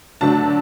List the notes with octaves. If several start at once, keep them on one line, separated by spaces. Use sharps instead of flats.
D3 F#3 A3 D4 A5